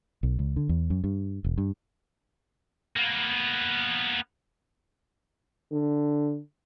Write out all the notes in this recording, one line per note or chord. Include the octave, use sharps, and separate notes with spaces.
B1
C#2
D3
E2
F#2
G2
E1
G2
A#3 B3
D3